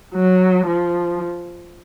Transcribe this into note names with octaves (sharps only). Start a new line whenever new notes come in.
F#3
F3